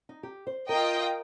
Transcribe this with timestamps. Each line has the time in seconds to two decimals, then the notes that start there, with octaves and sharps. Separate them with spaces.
0.09 D#4
0.23 G4
0.47 C5
0.69 F4 A#4 D#5 G5